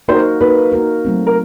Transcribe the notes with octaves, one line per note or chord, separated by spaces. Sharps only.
A#3 D#4 F#4 A#4 C5
A#3 D#4 F#4 A#4 B4
A#3 D#4 F#4 A#4
F#3 A3 C4
A#4